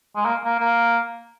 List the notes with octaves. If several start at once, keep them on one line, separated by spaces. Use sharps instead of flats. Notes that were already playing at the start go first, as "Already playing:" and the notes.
G#3
A#3
A#3
A#3